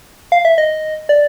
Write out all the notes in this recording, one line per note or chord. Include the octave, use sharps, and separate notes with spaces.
F5
E5
D#5
D5